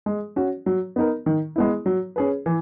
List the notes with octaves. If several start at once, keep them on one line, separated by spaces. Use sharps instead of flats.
G#3
C#4 F#4
F#3
B3 D#4 A#4
D#3
G#3 B3 E4
F#3
C#4 G#4 B4
E3